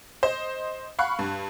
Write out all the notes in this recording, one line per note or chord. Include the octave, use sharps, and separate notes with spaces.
C5 D#5
F5 F#5 B5 C#6 F#6
G2